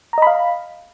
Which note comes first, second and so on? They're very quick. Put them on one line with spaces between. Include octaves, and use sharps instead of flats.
A#5 D#5 B5 F5